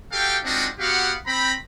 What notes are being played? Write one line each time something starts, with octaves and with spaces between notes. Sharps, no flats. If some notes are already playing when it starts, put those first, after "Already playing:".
F#4 G4 A4 F5 G5
G#3 C4 D4 D#4 F4 F#4
B3 F#4 G4 F5 F#5
C4 A#5 B5